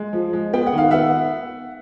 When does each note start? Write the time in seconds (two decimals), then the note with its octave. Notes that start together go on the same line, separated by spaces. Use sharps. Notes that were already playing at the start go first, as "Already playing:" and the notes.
Already playing: G#3
0.13 F3
0.33 G#3
0.53 B3 G5
0.66 F#5
0.73 D#3 F5
0.91 B3 E5 F#5